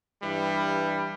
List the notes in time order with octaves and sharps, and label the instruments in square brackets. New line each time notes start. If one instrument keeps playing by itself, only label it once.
[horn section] G2 E3 G3